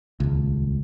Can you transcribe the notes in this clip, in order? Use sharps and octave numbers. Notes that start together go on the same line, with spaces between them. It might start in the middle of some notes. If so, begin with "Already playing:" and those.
D#1 C#2